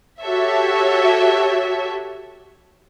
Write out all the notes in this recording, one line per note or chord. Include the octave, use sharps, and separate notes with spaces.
F#4 G4 A4 C#5 E5